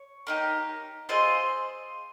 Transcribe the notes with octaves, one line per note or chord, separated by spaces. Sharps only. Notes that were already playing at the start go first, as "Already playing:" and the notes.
Already playing: C#5
A#3 D#4 G4
C4 F4 G#4 C5 D#5